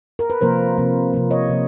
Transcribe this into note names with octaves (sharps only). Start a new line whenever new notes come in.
A#4
B4
C3 F3 A#3 A#4 C5
C3 F3 A#3
C3 F3 A#3
C#5 D#5
C3 F3 A#3